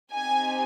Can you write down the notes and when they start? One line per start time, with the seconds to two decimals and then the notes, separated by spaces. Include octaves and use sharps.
0.12 C4 D#4 G4 G#5